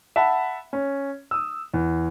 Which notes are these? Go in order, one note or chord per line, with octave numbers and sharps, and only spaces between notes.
E5 F#5 A5 B5
C#4
D#6 E6
E2